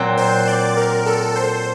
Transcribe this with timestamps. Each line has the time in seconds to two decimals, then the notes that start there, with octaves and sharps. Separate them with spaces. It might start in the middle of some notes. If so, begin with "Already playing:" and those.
Already playing: A#2 F#3 C4
0.17 C5
0.48 D5
0.77 A#4
1.06 A4
1.36 C5